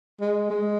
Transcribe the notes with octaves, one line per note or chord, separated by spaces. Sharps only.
G#3
G#3